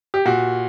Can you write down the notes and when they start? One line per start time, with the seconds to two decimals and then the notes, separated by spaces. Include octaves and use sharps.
0.14 G4
0.25 A#2 F#4